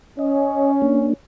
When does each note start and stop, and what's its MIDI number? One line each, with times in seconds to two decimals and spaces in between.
0.19 1.08 61
0.19 0.72 75
0.82 1.13 58
0.82 1.13 62